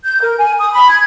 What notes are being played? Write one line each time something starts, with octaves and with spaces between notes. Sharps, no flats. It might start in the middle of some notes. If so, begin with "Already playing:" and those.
G6
A#4
G#5
D#6
B5
G#6